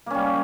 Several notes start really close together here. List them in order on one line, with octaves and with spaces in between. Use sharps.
A#3 C#4 G3